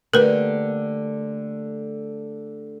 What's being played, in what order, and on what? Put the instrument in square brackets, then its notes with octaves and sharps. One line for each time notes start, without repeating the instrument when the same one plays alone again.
[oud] D3 A#3 [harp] A3 G4 [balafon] A#4 B4